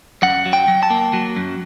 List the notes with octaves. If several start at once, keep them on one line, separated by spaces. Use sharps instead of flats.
F#2 F#5
F#3
G5
F#3
A5
A#3
F#3
F#2